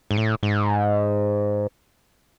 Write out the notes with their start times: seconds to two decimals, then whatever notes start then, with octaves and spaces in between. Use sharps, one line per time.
0.11 G#2
0.17 A2
0.43 G#2